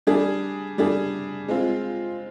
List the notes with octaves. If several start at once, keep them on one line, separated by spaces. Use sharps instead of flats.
G3 D4 G#4
G3 D4 G#4
G#3 C4 F4